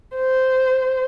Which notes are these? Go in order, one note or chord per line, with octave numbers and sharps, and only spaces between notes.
C5